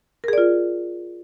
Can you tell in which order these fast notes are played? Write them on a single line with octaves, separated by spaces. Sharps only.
A#4 G#4 D5 F4